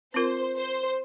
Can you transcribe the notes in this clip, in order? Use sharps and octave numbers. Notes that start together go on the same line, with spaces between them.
C4 F4 A#4 C5
C5